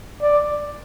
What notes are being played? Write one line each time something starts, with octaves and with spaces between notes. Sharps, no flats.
D5